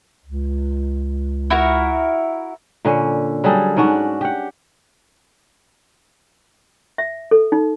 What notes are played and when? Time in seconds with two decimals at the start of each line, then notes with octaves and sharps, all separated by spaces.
0.25 C#2
1.50 E4 F#4 A#4
2.85 A#2 D3 C#4
3.44 F#3 G3 G#4 A4
3.77 G#2 C#4 D4 F#4
4.21 G4 F#5
6.98 E5
7.31 A4
7.52 D#4